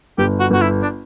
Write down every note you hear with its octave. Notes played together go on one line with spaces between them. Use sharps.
G1 G4
F#4
G1 F#4
E4
D4